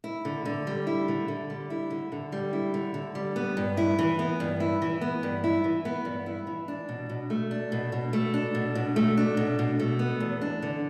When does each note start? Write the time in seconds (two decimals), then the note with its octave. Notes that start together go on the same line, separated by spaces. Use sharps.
0.04 E4
0.25 D3
0.45 D3
0.67 G3
0.87 E4
1.08 D3
1.28 D3
1.50 G3
1.70 E4
1.91 D3
2.12 D3
2.32 G3
2.53 E4
2.74 D3
2.94 D3
3.15 G3
3.36 B3
3.57 G2
3.77 E4
3.99 E3
4.19 B3
4.40 G2
4.60 E4
4.82 E3
5.01 B3
5.23 G2
5.44 E4
5.64 E3
5.85 B3
6.05 G2
6.26 E4
6.47 E3
6.68 D4
6.89 B2
7.09 B2
7.30 A3
7.51 D4
7.72 B2
7.92 B2
8.13 A3
8.34 D4
8.55 B2
8.75 B2
8.96 A3
9.17 D4
9.37 B2
9.59 B2
9.79 A3
9.99 B3
10.20 E2
10.41 D4
10.62 D3